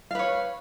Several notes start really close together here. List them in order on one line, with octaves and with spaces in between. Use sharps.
F5 B4 C#5